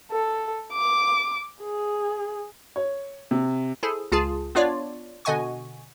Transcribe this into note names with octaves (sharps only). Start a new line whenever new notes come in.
A4
D6
G#4
C#5
C3
E4 G#4 A4 C5
C#2 F4 G#4 A5
B3 D4 F4 C#5 D5
B2 D3 D#5 F#5 G#5 C#6